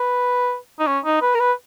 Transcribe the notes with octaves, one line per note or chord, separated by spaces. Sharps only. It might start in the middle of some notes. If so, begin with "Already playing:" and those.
Already playing: B4
D#4
C#4
D#4
B4
A#4
B4